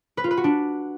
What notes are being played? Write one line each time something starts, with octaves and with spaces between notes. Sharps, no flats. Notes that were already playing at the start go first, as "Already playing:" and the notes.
B4
F4
B4
F#4
D4